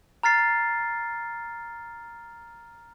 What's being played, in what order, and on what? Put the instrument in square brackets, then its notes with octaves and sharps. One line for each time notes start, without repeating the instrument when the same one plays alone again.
[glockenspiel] A#5 F6 A6 C7